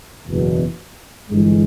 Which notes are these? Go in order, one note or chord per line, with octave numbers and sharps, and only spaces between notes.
F#1 E2 B2
G1 G2 E3 G#3